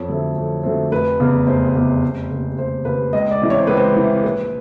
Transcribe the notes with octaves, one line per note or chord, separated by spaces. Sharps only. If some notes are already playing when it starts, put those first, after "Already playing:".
Already playing: F2 C#5
D3 F#3 A3 C4
F2
D3 F#3 A3 C4
F1 B4
E2 C#3
F1 C5
E2 C#3
F1
D#2 C#3
F1 C5
D#2 C#3 B4
C#2 D#5
D5
C3 E3
C#5
C5
C#2 B4
C5
C3 E3
A#1 B4